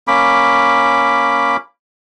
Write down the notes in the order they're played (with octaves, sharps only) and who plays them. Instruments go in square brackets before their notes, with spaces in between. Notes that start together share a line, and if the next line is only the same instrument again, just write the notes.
[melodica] A#3 C#4 B5 D6